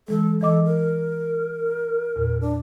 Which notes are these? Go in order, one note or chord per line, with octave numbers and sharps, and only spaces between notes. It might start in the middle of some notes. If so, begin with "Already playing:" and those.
E3 G#3 A4
E3 A4 D#5 D6
A#4
E2 A#2
D4